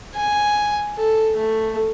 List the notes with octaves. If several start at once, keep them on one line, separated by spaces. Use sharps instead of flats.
G#5
A4
A3